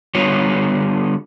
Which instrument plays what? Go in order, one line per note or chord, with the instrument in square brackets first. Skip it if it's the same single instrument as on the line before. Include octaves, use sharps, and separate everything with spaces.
[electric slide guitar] D3 G3 B3 F4 C#5